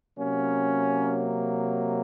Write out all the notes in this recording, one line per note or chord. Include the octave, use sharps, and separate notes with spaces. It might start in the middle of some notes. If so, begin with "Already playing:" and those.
C3 F#3 A#3 C#4